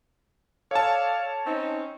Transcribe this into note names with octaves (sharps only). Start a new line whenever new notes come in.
A4 C#5 D5 F5 A5
C4 C#4 D#4